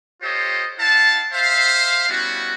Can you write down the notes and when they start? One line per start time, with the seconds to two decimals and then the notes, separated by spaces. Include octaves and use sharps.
0.22 F4 G4 A4 C5 C#5 D#5
0.79 E4 F5 F#5 A5
1.33 C5 E5 F5
2.08 G3 B3 C#4 E4 F#4